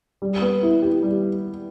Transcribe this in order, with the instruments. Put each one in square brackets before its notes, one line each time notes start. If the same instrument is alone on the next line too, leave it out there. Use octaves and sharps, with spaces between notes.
[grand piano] G3
B3
E4
G4
G3